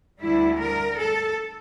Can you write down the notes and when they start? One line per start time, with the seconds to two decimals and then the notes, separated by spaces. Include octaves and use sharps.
0.20 D2 D3 G3 E4
0.58 A#4
0.96 A4